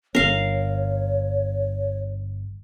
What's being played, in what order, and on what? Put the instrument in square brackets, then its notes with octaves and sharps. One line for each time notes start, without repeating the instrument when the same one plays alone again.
[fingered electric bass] G1 C#4 [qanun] A#4 F5 [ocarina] C#5